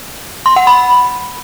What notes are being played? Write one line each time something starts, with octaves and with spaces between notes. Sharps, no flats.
C6
F#5
B5